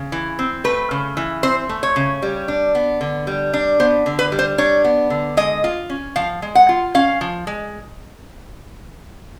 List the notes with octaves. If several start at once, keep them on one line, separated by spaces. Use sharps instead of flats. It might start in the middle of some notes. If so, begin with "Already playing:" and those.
Already playing: C#3
E3
C4
A3 B4
C#3
E3
C4 C5
A3
C#5
C#3
G3
D4
B3
D3
G3
D4
B3 C5
D3
B4
G3
C5
D4 C#5
B3
D3
G#3 D#5
F4
C#4
F3 F5
G#3
F#5
F4
C#4 F5
F3
G#3